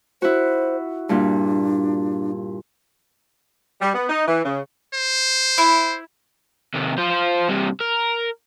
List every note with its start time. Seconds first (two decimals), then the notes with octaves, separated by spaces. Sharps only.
0.22 E4 F#4 C5
1.09 G2 A#2 D4
3.81 G3
3.94 B3
4.09 D#4
4.26 E3
4.45 C#3
4.94 C5
5.58 E4
6.74 C3 D#3
6.98 F4 C5
7.49 G2 C3
7.80 A#4